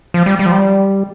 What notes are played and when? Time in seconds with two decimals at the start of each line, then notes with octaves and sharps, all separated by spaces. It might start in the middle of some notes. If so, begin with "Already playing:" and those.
0.14 F3
0.26 G3
0.39 G3
0.46 F3
0.52 G3